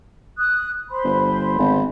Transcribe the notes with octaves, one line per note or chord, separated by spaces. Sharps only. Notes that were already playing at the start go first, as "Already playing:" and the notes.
D#6 F#6
C5 B5 C6
G1
G#1